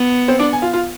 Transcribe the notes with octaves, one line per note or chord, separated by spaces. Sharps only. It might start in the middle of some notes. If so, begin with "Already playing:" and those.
Already playing: B3
C4 C5
D4 D5
G#5
F4 F5
F4 F5